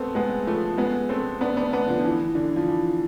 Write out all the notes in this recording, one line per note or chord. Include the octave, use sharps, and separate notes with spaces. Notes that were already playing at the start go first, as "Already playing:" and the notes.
Already playing: A3 B3 C4
G#3 B3
F3 A3
G#3 B3
A3 C4
B3 D4
B3 D4
B3 D4
D3 F3
F3
E3
D3
F3
E3